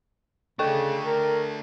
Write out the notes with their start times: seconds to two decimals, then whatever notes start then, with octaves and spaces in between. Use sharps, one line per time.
0.59 C#3 A3 D4 A4 G5 C#6
1.04 A#4